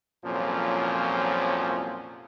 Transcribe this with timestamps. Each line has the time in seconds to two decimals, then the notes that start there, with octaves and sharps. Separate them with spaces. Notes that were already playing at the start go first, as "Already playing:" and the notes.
0.25 C2 F2 A#2 F3 F#3 C#4